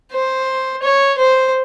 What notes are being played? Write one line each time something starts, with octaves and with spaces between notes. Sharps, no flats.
C5
C#5
C5